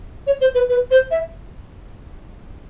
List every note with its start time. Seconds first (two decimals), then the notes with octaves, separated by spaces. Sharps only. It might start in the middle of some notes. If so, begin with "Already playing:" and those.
0.27 C#5
0.41 C5
0.55 B4
0.69 B4
0.91 C5
1.11 E5